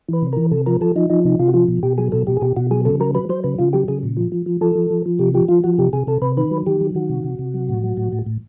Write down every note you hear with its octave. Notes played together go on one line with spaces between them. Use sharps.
E3 B4
C3
E3 A#4
C3 A4
F3 A#4
F3 A4
F3 D#4
F3 D#4
C3 D#4
C3 F4
F#4
F3 F4
B2
B2 G4
F#3 G#4
B2 A4
B2 G4
G#4
B2 G4
B2 F#4
F#3 G#4
C#3 A4
F#3 A#4
F#3 B4
F#3 C5
C#3 B4
C#3 F4
F#3 G4
C#3 G#4
A#2
F3
F3
F3
F3 A4
F3
F3
F3
C3 G4
F3 G4
F3 F4
F3 F#4
C3 G4
C3 G#4
C3 A4
C3 B4
D#3 B4
F#3
D#3 G4
F#3
D#3 F#4
C3
C3
C3
F#3
A2
F#3
A2
A2
A2